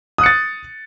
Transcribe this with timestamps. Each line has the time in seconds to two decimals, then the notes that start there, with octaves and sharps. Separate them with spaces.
0.18 D#6
0.21 F#6
0.23 C#7
0.26 A6